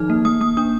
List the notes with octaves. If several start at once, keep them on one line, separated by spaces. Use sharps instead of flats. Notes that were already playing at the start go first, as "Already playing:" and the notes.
Already playing: D#3 F3 D#4 F6
A#3
A#3 D#6
A#3 D#6
D4 D#6